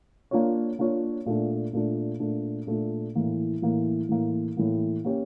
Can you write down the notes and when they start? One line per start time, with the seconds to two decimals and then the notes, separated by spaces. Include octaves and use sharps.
0.31 A#3 D4 F4 C#5
0.79 A#3 D4 F4 C#5
1.26 A#2 A3 D4
1.73 A#2 A3 D4
2.20 A#2 A3 D4
2.67 A#2 A3 D4
3.15 A2 E3 A#3
3.62 A2 E3 A#3
4.09 A2 E3 A#3
4.57 A2 E3 A#3
5.05 A#3 C#4 G4